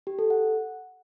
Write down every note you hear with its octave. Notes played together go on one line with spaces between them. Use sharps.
G4
A4
F#5